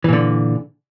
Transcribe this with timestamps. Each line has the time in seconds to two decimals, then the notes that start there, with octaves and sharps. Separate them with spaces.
0.04 E3
0.09 A#2
0.13 D3